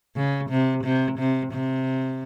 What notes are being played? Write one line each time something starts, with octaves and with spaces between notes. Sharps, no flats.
C#3
C3
C3
C3
C3